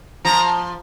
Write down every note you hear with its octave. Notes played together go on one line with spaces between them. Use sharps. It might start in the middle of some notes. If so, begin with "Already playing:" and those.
F3 A#5